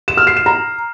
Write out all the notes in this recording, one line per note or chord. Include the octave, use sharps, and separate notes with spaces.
E7
F6
C7
E7
A#5